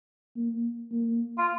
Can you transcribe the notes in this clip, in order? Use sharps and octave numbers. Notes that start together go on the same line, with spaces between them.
A#3
A#3
F4